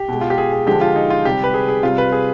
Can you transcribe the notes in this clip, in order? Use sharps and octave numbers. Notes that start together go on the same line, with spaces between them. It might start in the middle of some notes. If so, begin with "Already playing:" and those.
Already playing: G4
B2 G#3
F4
G4
G#4
G#4
D3 F3 G#3 G4
F4
D#4
F4
C3 G3 G4
B4
G#4
G#4
C3 G3 F4
B4
G#4